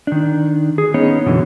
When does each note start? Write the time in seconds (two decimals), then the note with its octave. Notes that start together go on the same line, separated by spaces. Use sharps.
0.07 D#3 D4
0.78 G#4
0.94 B3 C#4 D#4 C#5
1.26 F#2 B2 D3 E3